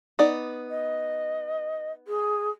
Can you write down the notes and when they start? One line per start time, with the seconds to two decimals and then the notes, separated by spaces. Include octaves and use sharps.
0.19 B3 D#4 D5
0.69 D#5
2.07 G#4